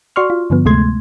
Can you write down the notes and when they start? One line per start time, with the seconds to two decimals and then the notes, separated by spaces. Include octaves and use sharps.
0.16 F#4 D5 C6 C#6 F6
0.30 F4
0.50 G2 D3 F3 B3
0.65 D2 C3 G#3 A3 C6 G#6